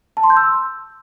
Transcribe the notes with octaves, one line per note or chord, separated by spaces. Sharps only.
A5
C6
G6
E6
C6